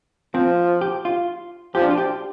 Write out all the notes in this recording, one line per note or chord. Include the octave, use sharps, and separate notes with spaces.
F3 C4
G4
F4
F3 G4
D4
F4
G4